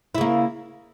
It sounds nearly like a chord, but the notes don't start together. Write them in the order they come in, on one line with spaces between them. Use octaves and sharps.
E4 C#3 A#3